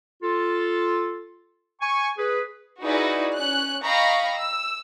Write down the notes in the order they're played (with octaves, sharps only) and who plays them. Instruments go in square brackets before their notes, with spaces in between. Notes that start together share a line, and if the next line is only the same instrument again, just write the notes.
[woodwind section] F4 A4
G#5 C#6
G#4 B4
[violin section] D#4 E4 F#4 G#4 B4 D5
C#4 F#6
D#5 F5 G5 A#5 B5 C#6
E6